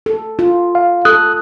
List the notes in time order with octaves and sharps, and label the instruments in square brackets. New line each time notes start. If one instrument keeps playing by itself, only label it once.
[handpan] A4
F4
[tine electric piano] F5
[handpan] A4 [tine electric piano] D#6 F#6